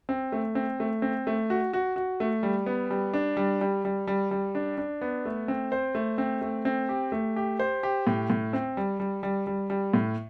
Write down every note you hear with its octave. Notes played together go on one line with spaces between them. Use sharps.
C4
A3
C4
A3
C4
A3
F#4
F#4
F#4
A3
G3
B3
G3
D4
G3
G3
G3
G3
G3
D4
D4
B3
A3
C4
C5
A3
C4
A3
C4
G4
A3
G4
C5
G4
A2
A2
C4
G3
G3
G3
G3
G3
A2